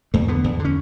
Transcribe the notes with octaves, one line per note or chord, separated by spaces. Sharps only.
E2 A3
D3 B3
E2
D3
C#4